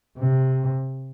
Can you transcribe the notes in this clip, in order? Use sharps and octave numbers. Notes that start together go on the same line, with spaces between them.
C3